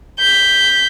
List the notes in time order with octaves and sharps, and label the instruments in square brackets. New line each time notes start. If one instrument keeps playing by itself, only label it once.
[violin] G6 B6